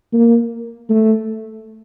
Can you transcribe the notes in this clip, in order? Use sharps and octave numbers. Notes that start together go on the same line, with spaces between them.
A#3
A3